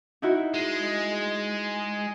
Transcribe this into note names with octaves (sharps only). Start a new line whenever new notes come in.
D#4 E4 F#4
G#3